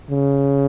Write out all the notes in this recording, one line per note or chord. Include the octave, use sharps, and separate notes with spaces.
C#3